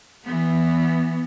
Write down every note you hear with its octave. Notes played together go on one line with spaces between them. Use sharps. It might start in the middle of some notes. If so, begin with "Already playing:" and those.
E3 B3